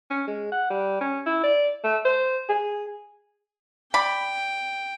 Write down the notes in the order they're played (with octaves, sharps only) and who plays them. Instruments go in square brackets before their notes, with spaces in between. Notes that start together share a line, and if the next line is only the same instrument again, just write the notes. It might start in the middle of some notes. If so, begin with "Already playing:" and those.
[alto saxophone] C#4
G#3
F#5
G3
C#4
E4
D5
A3
C5
G#4
[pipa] D5 B5 [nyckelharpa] G5